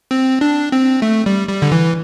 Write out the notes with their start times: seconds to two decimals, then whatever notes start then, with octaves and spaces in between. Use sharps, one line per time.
0.11 C4
0.41 D4
0.72 C4
1.02 A3
1.26 G3
1.49 G3
1.62 D3
1.72 E3